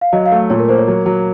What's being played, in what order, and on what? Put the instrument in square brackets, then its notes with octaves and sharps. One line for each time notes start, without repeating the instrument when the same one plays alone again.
[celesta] F5
[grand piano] F#3 [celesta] D#5
[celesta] F5
[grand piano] A3
[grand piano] A#2 [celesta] C#5
[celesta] A#4
[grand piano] A#3 [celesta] C5
[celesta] C#5
[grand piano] F#3
F#3